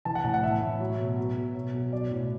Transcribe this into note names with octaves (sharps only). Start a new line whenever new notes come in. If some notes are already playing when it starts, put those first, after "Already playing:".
E3 A5
F#5
A2 A5
F#5
E3 E5
A2
F#3
B2
F#3
B2
F#3
B2
F#3 D5
A2